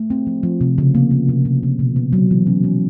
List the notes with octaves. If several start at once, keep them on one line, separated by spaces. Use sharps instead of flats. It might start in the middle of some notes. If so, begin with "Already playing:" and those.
Already playing: A3
C4
F3
F3
C3
C#3
A#3
A#3
C3
C3
C3
B2
B3
F#3
E3
C#4
C#4